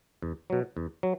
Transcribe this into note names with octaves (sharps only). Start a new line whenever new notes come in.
E2
B2 F#3
E2
F#3